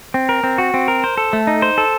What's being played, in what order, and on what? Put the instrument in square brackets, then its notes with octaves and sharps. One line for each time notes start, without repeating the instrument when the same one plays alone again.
[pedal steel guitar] C4
A#4
C4
F#4
C4
A#4
C5
A4
A3
D#4
C5
A4